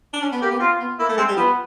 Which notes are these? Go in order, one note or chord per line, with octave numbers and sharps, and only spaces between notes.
D4
C#4
B3
A#3 G4
B3
C4 F4
B3
A#3 E4
A3
G#3 C4
G3
F3 B3